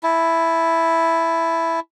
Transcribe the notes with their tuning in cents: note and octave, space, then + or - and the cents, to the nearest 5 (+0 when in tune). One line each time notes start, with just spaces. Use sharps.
E4 +0 A5 -30